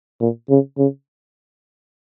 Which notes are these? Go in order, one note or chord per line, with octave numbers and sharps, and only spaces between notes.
A#2
C#3
C#3